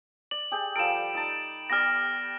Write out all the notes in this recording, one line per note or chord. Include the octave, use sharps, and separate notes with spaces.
D5 F#7
G4 G#4 G5
F3 G3 A4 D7 E7
D#4 A5
B3 G4 D5 F6 A#6